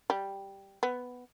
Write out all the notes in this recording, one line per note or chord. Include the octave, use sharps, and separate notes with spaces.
G3
B3